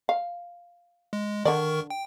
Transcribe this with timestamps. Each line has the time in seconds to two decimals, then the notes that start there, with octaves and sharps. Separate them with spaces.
0.09 F5
1.13 G#3
1.45 D3 D#3 A#4 D5 C#6
1.90 G5